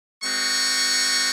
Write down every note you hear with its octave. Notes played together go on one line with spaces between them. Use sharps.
G#3 C4 F#4 C#6